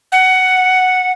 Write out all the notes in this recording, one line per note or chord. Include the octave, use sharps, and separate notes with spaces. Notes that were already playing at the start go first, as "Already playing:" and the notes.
F#5